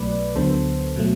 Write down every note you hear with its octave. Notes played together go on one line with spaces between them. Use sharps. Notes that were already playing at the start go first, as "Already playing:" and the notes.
Already playing: B1 B2 F#3 A3 B4 D5
D2 D3 F#3 B3 A4 C5
B2 F#3 A3